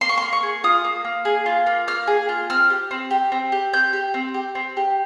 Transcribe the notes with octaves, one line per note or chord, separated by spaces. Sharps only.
A#3 C6
C#6
C6
A#3
C#6
G#4
F4 D#6
A#3
A#3
G#4
F4
A#3
A#3 F6
G#4
F4
C4 F6
G4
C4
G4
C4
G4
C4 G6
G4
C4
G4
C4
G4